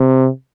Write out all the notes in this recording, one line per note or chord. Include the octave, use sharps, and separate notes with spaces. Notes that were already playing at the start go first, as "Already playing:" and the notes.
Already playing: C3